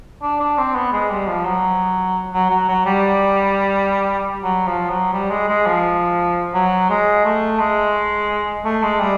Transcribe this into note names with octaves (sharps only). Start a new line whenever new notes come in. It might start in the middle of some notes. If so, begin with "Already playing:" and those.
D4
D4
C4
B3
G#3
G3
F3
F#3
F#3
F#3
F#3
G3
F#3
F3
F#3
G3
G#3
G#3
F3
F#3
G#3
A3
G#3
A3
G#3
G3